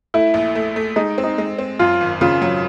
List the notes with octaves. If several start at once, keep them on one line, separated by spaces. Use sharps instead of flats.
A3 E4
A#1
A3
A3
G#3 D#4
C4
D#4
G#3
C4
F#2 F4
G#1
C#3 F4
F#3